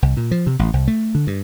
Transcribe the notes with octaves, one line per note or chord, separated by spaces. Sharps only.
C2
A#2
F3
C3
A1
C2
A3
D3
G2